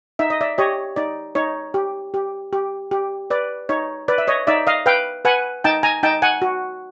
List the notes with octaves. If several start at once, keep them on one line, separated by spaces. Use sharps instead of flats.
D#4 E5
D#5
D5 E5
G4 C#5 D#5
D#4 D5
D#4 C#5
G4
G4
G4
G4
B4 D5
D#4 C#5
B4 D5
E5
C#5 D#5
D#4 D5 E5
D#5 F5
B4 F5 G5
B4 F#5 G#5
D#4 G5 A5
G#5 A#5
D#4 G5 A5
F#5 G#5
F#4